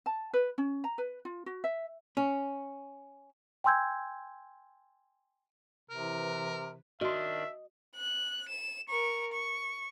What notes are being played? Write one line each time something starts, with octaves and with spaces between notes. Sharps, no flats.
A5
B4
C#4
A#5
B4
F4
F#4
E5
C#4
G5 G#5 C6 E6 G6 G#6
C3 E3 A#4 B4
D#3 D4 F#4 D#5 E5 C6
F#6
E7
A#4 C#6
C#6